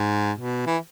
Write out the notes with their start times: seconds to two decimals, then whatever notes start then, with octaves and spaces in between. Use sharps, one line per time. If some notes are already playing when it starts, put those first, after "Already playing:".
Already playing: G#2
0.39 B2
0.66 E3